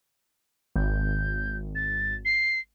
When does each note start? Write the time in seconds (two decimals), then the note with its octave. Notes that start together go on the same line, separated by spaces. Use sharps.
0.76 G#1 G6
1.75 A6
2.25 C7